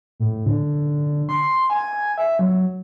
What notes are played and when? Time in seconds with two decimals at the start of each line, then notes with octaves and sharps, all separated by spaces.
0.20 A2
0.46 D3
1.29 C6
1.70 G#5
2.18 E5
2.39 F#3